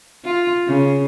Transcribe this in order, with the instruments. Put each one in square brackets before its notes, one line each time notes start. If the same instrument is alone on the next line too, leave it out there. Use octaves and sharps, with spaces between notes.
[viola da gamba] F4
C#3